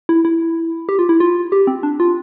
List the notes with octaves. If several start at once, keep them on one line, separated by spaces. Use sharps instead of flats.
E4
E4
G4
F4
E4
F4
G4
C4
D4
F4